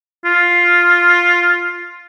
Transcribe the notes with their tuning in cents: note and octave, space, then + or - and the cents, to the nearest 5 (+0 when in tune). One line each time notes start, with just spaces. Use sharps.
F4 +5